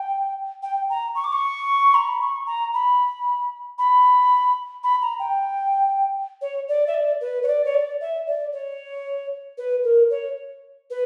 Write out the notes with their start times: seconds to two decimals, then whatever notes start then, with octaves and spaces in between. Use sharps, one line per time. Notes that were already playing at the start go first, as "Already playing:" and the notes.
Already playing: G5
0.62 G5
0.89 A#5
1.15 C#6
1.24 D6
1.32 C#6
1.94 A#5
2.07 B5
2.20 C#6
2.46 A#5
2.74 B5
3.78 B5
4.83 B5
5.01 A#5
5.19 G5
6.41 C#5
6.68 D5
6.87 E5
6.94 D5
7.21 B4
7.42 C#5
7.47 D5
7.64 C#5
7.74 D5
8.00 E5
8.27 D5
8.52 C#5
9.57 B4
9.83 A#4
10.10 C#5
10.90 B4